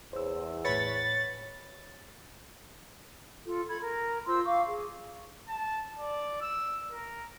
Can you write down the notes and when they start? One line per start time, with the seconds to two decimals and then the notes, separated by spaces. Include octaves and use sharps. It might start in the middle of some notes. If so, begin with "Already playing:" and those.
0.13 E2 C5 C#5 E6
0.65 A2 B4 C#5 B5 A6 C#7
3.46 F4 A4
3.68 A4 B5 G#6
3.82 A#4
4.26 F4 C5 C6 E6
4.45 F5 C#6 D6
4.66 G#4
5.48 A5
5.98 D5
6.41 E6
6.92 A#4